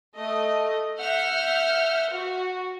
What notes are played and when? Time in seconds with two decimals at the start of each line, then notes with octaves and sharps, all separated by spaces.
0.14 A3 D#5
0.99 E5 F#5 F6 G6
2.10 F#4